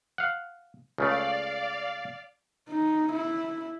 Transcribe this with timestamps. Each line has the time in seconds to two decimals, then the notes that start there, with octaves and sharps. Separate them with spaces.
0.18 F5 F#5
0.98 C#2 C#3 A3 D5 F5
2.69 D#4
3.13 E4